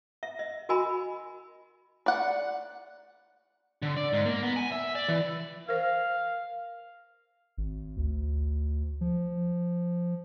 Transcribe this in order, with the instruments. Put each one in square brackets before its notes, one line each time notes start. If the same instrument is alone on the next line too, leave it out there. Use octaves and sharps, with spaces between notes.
[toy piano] E5
D#5
F#4 A#4 D#5 G#5 B5
[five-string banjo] D5 F#5
[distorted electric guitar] D3
D5
G#2
A#3
B3
G#5
E5
D5
E3
[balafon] A#4 C5 [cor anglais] F5
[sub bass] G#1
D2
F3